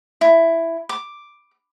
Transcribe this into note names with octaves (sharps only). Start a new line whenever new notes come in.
E4
D6